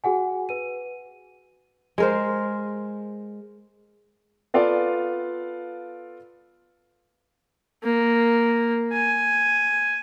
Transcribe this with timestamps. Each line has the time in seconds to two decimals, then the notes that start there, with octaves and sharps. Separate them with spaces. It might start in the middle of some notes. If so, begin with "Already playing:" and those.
0.04 F#4 G#4 F#5 G#5
0.49 B4 D#7
1.98 G#3 A#4 C5
4.54 B3 F4 A4 D5 F5
7.84 A#3
8.93 G#5